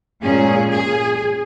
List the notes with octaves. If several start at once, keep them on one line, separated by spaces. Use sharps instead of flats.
A#2 G#3 C#4 G#4
G#4